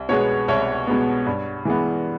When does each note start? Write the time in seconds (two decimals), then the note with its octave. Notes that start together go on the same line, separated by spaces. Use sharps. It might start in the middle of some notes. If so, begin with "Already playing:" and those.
Already playing: C2
0.09 B2 G#3 B3 C#5
0.48 C2 C#5
0.87 B2 G#3 B3
1.26 G2
1.65 E3 G#3 B3